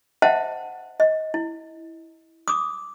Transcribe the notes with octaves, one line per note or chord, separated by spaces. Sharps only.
C5 D#5 E5 F#5 G5 A5
D#5
E4
D6 D#6